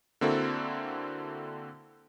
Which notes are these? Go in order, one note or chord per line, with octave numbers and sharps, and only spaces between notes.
D3 A#3 C4 E4 F#4 A4